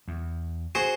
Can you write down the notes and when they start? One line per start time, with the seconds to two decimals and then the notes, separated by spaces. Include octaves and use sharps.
0.08 E2
0.75 F#4 G#4 C5